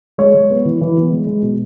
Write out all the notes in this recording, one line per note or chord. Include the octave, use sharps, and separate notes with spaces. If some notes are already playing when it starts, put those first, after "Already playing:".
G#3 C#5
G#3
B3
E3
E3
B3
G#3
G#3
B2